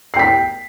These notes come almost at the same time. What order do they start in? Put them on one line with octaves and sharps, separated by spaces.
C7 G5 B6